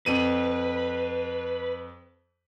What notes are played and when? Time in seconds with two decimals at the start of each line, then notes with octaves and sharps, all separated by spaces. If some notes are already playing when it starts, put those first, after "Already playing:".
0.06 F2 B4 D#7